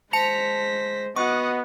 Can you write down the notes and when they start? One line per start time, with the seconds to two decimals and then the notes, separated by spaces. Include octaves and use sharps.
0.13 G#3 C5 A5 A#6 B6 C#7 F7
1.16 B3 F#4 D#5 F#5 C#6 D#6